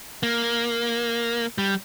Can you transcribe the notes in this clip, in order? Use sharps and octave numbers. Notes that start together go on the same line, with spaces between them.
A#3
G3